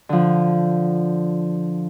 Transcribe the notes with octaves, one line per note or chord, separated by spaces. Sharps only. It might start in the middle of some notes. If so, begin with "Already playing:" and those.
D3 F3